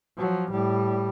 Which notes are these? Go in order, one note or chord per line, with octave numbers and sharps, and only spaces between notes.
F3 F#3
A2 G3